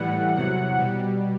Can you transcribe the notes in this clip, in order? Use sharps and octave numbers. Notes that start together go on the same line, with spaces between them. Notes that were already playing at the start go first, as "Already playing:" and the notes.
Already playing: A2 E3 G3 F#5
E2 C3 F#3 F#5
B2 G3